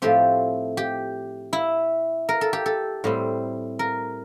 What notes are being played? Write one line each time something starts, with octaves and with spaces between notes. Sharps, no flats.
A2 F3 A3 C4 G4
G4
E4
A#4
A4
G4
A4
A2 G3 C4
A#4